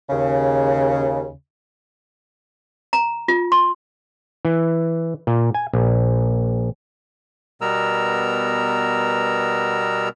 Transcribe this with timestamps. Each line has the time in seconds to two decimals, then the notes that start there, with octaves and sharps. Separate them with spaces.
0.10 D#2 C#3
2.93 A#5
3.28 F4
3.52 C6
4.45 E3
5.27 A#2
5.54 G#5
5.73 A#1
7.61 B2 G3 B3 A#4 A#5 E6